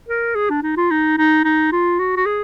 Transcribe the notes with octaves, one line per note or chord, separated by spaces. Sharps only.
A#4
G#4
D4
D#4
F4
D#4
D#4
D#4
F4
F#4
F#4
G#4